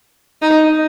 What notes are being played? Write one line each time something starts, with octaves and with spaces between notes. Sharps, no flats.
D#4